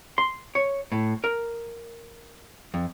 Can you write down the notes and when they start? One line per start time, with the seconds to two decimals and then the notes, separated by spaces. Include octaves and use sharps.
0.18 C6
0.55 C#5
0.92 A2
1.24 A#4
2.74 F2